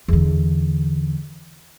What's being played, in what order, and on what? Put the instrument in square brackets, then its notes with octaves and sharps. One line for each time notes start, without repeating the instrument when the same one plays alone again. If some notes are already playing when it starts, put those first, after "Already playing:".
[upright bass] E2 D3